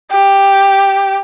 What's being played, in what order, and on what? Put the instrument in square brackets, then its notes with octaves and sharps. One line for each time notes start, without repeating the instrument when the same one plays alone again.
[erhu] G4